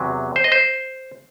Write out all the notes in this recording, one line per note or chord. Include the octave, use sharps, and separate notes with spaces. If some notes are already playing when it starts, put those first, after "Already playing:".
Already playing: E2 C3 F#3
C5
D#5
C5